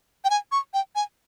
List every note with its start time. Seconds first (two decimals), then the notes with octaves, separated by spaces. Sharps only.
0.25 G5
0.30 G#5
0.52 C#6
0.74 G5
0.95 G#5